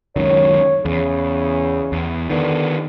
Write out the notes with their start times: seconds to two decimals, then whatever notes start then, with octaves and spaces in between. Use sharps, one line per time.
0.16 C#2 F#2 D#3 C#5
0.85 E2 C#3
1.92 E2
2.30 D3 D#3 B3